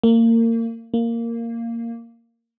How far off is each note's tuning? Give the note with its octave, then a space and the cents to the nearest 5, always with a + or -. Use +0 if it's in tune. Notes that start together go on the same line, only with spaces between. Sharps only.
A#3 -30
A#3 -10